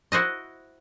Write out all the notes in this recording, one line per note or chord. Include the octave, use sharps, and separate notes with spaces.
E4 F#4 C5 D#5